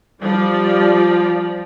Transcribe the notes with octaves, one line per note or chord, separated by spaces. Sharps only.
F3 G3 D5